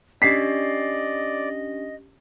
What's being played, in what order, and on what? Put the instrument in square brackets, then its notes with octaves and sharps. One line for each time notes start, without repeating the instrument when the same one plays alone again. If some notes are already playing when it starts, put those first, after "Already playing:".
[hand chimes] C#4 D4 G4 [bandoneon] D5 [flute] D#5 [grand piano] B6 C7